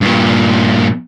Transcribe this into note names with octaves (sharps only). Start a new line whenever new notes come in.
G2 A#2